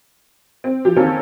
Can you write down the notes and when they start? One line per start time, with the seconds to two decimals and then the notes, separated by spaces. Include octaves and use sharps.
0.64 C4
0.85 F3 G4
0.96 D#3 A#3 C4 C#4 G4 A4